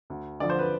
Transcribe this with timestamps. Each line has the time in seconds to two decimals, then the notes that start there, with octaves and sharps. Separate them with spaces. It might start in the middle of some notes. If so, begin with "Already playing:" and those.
0.10 D2
0.40 D3 F3 D5
0.50 C5
0.59 B4